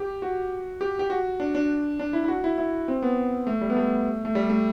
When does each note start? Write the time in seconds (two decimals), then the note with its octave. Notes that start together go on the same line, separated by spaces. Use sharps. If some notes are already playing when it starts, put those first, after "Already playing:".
Already playing: G4
0.22 F#4
0.81 G4
0.99 G4
1.10 F#4
1.40 D4
1.55 D4
1.99 D4
2.13 E4
2.24 E4
2.28 F#4
2.44 E4
2.58 E4
2.88 C4
3.02 B3
3.47 A3
3.61 G3
3.70 B3
3.77 A3
4.25 A3
4.35 G3
4.50 A3